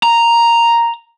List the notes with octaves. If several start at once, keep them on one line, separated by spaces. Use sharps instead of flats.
A#5